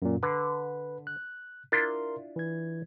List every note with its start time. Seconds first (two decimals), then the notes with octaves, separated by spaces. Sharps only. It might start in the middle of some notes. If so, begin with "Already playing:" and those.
0.02 F#2 A#2
0.23 D3 B4
1.07 F#6
1.72 D4 E4 F4 A#4 C6
2.36 E3 G#6